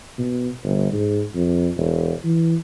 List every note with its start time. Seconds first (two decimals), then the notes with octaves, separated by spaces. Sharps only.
0.18 B2
0.64 G1
0.93 G#2
1.35 F2
1.77 E1
2.24 E3